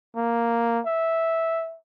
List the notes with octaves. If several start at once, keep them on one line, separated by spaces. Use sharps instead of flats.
A#3
E5